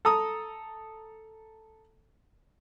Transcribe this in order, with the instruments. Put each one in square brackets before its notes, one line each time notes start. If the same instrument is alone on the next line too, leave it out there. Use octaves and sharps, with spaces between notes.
[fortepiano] A4 A#5 D#6